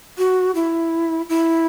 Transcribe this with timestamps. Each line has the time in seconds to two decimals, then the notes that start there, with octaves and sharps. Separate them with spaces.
0.18 F#4
0.55 E4
1.29 E4